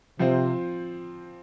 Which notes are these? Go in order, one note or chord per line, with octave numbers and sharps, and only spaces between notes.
C3 F3 C4 F4 C5